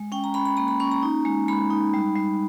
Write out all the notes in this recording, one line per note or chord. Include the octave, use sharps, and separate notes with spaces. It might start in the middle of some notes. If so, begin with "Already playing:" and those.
Already playing: G#3
C#4 G5
A#5
C#4 B5
B5
A#3 A#5
B5
C#4 C#6
A#5
D#4
G#3
G#3 B5
D#4
G3
G3